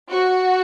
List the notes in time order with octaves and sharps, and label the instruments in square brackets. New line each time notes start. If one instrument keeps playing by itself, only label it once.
[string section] F#4